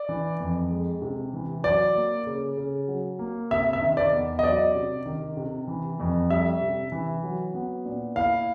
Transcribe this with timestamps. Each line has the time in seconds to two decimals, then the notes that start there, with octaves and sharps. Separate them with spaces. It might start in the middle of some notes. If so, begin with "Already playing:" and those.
Already playing: D5
0.09 E3
0.40 F2
0.71 G#3
1.02 C3
1.33 E3
1.64 F#3 D5
1.95 A#3
2.26 C#3
2.57 C#3
2.88 F#3
3.19 A#3
3.51 C3 E5
3.73 E5
3.82 D#3
3.97 D5
4.13 E2
4.39 D#5
4.44 F#3 D5
4.74 C3
5.06 D#3
5.37 C3
5.67 E3
6.00 F2
6.30 G3 E5
6.61 C3
6.92 E3
7.24 F#3
7.54 B3
7.85 A#2
8.16 E4 F5